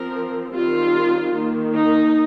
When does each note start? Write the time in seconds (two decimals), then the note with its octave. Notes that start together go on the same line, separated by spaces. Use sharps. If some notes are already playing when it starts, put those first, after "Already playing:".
Already playing: F3 C4 A#4
0.54 D#3 G3 C4 F4
1.34 D#3 A#3
1.74 D#4